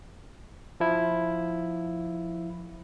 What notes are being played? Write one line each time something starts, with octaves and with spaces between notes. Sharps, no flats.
F3 E4